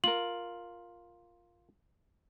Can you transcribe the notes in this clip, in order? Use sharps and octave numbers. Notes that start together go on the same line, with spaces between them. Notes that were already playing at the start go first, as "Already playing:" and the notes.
F4 A#4 F#7